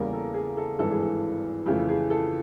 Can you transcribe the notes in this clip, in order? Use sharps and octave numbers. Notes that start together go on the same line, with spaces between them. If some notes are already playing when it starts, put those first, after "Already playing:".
Already playing: E2 C#3 E3 G3 A#3 A#4
A4
G#4
A4
G#1 G2 E3 A4
G#4
A4
F2 C#3 E3 A3 G4
G#4
A4